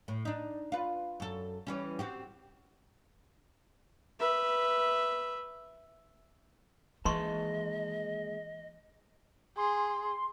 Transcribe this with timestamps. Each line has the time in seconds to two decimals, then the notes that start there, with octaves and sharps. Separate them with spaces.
0.08 A2
0.25 D4 D#4
0.72 F4 B4
1.20 F#2 A4
1.67 E3 G3 C#4
1.99 C4 F#4 G4
4.20 B4 E5
7.05 D#2 E3 G#3 B4 D#5 A5 C6 C#6
9.57 G#4 C6